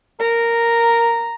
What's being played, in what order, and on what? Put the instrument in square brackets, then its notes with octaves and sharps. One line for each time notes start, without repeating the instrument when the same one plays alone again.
[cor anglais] A#4 [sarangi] A#5